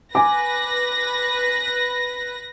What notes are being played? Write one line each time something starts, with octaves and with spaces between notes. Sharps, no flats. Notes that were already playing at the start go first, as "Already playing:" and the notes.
B4 G#5 D6 A#6